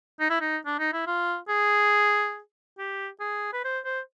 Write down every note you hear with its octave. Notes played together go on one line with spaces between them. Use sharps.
D#4
E4
D#4
D4
D#4
E4
F4
G#4
G4
G#4
B4
C5
C5